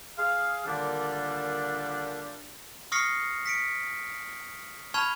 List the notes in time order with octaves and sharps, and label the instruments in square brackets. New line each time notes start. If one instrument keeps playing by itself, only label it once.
[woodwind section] G#4 F5
A#2 D3 D#3 G3 D4
[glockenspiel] C#6 D#6 F6 A#6 C7 C#7
B6 C#7 D7
A5 B5 C#6 F6 G#6 F7